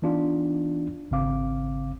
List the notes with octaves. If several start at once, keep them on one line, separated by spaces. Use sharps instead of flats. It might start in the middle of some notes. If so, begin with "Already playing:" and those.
E3 B3 D4 D#4 F4
G#1 C#3 C4 F5 D6